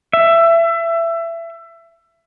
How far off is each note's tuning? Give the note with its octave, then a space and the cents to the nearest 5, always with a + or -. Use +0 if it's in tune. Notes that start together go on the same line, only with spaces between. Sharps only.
E5 +25